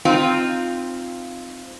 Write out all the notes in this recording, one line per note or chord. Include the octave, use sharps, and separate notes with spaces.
C4 D#4 F4